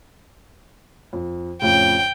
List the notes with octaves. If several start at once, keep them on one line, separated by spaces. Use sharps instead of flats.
F2
F2 A2 C#3 G5